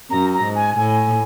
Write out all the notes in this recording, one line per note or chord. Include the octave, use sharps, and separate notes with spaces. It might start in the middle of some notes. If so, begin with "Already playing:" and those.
F#2 A#5
A#5
G#2
G#5
A2 G#5